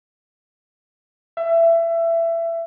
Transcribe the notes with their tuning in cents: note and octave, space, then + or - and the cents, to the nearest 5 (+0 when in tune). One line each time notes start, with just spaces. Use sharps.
E5 +20